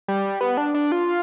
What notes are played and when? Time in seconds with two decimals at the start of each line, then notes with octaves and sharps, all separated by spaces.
0.08 G3
0.41 B3
0.57 D4
0.74 D4
0.92 F4